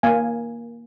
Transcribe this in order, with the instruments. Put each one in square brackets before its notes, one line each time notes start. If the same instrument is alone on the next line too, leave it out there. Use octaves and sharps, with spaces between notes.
[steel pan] A#3 F5 G#5